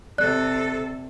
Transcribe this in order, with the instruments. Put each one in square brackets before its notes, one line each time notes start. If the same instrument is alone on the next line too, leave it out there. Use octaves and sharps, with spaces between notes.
[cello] C3 A4 [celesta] D5 F#6